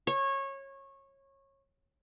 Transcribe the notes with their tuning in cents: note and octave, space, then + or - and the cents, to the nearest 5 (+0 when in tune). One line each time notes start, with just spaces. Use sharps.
C#5 -20